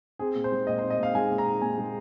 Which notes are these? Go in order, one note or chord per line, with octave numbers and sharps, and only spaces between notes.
C4 G#4
A#2
C5
G#3
A#2 D#5
C5
C4
D#5
A#2 F5
G#3 G#5
A#2
A#5
C4
A#2 G#5
G#3